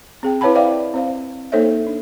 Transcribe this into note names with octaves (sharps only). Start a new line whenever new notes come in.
C4 G#4 G5
E4 B4 C#5 F5 A5 B5
C5 D5 E5 F5 G5 D6
C4 C5 F5
A#3 D#4 A4 C5 C#5 E5
D4